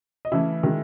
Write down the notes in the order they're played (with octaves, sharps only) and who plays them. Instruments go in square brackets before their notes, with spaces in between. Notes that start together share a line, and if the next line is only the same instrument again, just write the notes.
[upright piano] D#5
C#3 E3 A3 E4 E5
D#3 G#3